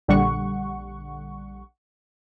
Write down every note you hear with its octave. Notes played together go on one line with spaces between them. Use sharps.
A#1 D3 G3 F#5 C#6